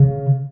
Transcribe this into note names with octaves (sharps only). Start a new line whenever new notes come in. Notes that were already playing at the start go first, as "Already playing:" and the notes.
Already playing: C#3